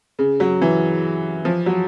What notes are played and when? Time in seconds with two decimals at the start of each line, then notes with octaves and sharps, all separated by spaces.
0.19 C#3
0.40 F#3
0.61 E3
1.45 F3
1.66 F#3